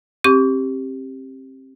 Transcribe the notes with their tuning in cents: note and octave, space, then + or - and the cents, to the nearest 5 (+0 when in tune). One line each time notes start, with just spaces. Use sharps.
C4 +30 G4 +0 D6 -45